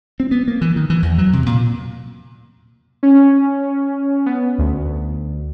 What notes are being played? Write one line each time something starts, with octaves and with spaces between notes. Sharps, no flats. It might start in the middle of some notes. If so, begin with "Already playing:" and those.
C4
B3
A#3
E3
D#3
E3
E2
F#3
C3
A#2
C#4
B3
D2